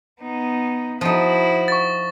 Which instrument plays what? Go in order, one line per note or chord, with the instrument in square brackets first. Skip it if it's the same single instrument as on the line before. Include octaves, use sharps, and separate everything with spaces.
[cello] B3 D#4
[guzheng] F3 D#4 [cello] E4 F#4
[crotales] C#6 A6